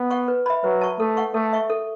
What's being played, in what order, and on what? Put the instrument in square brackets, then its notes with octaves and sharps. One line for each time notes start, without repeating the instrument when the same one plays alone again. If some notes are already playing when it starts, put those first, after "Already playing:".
Already playing: [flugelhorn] B3
[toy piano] F#5 C#6
B4
E5 B5
[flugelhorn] F#3 [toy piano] B4
[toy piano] A5 C#6
[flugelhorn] A3 [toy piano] A4
[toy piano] F#5 C#6
[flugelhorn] A3 [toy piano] A4
[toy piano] E5 C#6
A4